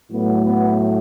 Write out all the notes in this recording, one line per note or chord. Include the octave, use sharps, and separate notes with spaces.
A2 F#3 A3 B3
B3